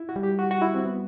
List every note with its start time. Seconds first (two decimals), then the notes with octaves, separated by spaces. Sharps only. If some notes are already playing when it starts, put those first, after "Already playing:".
Already playing: E4
0.09 F#4
0.16 G3
0.23 G4
0.39 F#4
0.51 F#4
0.62 E4
0.74 C4
0.85 B3